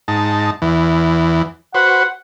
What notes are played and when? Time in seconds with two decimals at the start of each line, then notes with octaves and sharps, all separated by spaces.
0.08 G#2 D#4 A5
0.62 E2 E3
1.75 F#4 B4 C5 F#5